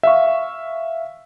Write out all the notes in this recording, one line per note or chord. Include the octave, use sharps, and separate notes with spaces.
E5 F5 C#6